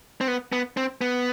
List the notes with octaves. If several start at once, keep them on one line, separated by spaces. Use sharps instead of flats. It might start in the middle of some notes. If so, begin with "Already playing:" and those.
C4
B3
B3
C4
B3